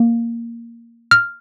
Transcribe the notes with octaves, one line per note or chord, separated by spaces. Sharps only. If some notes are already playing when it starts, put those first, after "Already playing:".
Already playing: A#3
F6